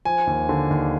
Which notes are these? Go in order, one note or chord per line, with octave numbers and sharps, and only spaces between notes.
F3 G#5
D#2
D3
D#2